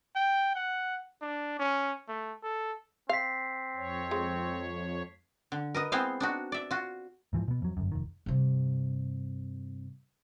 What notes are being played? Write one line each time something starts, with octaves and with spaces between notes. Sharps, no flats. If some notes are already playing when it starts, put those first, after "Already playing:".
G5
F#5
D4
C#4
A3
A4
C4 F5 B6 C7
F2 C#5
G#3
D3
A#4 B4 D#5
G#3 B3 C4 E4 C5 F5
D4 D#4 F#4
D5 E5
F4 F#4
G#2 E3 F3
B2 B3
F2 F#3
G1 F#2
F1 B1 D#3
G2 C3